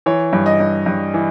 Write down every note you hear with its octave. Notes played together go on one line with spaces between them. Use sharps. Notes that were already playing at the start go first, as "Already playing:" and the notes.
E3 C#5
G2
D#5
G2
G2
E3